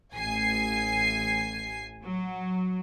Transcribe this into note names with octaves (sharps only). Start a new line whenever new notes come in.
A1 G#5 C7
F#3